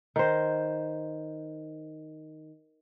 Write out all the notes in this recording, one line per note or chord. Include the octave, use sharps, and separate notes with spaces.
D#3 C5